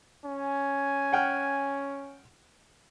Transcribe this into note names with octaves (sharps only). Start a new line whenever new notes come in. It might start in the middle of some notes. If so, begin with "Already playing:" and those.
C#4 G#5
F#5 G5 F6